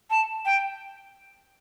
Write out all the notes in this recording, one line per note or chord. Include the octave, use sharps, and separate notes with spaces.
A5
G5